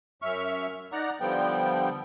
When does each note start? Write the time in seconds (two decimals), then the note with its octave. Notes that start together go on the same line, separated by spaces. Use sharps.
0.22 F#2 E5 C#6 F6
0.92 D#4 D5 F#5 A#5
1.20 D3 F3 G3 B3 G5